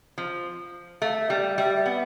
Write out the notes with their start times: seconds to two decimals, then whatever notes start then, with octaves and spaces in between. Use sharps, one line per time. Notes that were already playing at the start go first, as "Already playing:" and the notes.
0.18 F3
1.02 A3 F5
1.15 E5
1.29 G3 D5
1.44 E5
1.57 G3 E5
1.76 E5
1.86 B3